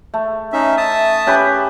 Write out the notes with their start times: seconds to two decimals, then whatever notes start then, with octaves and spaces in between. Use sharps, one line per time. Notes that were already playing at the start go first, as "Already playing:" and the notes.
0.14 A3
0.53 C#4 D#4 E5
0.77 E5 A5 D#6
1.27 C#4 G4 B4